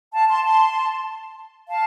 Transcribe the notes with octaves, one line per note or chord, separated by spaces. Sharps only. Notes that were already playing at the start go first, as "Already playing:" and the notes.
F5 A5
A5 C6
A5 C6
F5 A5